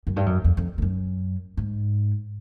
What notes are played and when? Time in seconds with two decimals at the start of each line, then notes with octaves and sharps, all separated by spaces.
0.07 F#2
0.16 G2
0.26 F#2
0.44 F2
0.57 F2
0.78 F2
0.82 F#2
1.57 G#2